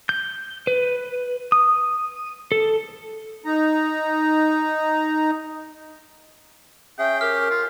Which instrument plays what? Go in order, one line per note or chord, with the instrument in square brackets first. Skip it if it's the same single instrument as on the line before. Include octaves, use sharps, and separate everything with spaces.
[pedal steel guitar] G6
B4
D#6
A4
[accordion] D#4 A#5
[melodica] C#4 G#4 [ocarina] E5 [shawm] G5
[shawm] G4 [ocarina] A#4 [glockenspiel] F6
[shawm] F4